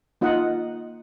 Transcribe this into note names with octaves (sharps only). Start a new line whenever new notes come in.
A#3 D#4 F4 D#5 F#5